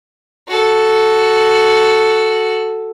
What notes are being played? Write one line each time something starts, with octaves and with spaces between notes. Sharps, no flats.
F#4 A4